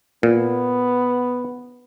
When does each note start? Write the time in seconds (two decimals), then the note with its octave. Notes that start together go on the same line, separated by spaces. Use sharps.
0.23 A#2 B3